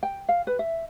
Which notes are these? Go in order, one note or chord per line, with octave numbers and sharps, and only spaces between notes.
G5
F5
B4
E5